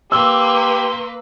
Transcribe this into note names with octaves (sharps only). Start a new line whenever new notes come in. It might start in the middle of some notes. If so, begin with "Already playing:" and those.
A#3 G4 B4 C6 E6